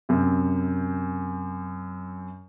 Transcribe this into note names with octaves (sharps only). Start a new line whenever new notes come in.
F#2 C3